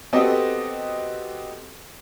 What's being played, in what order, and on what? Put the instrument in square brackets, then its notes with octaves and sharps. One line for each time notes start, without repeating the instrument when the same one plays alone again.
[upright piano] B3 C4 F#4 G4 A4 D#5